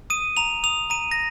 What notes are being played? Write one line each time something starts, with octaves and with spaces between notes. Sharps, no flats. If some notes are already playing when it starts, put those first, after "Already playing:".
D#6 D#7
A#5 F7
D#6 F7
A#5 D#7
A#6